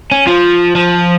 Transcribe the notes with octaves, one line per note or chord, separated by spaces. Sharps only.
C#4
F3
F3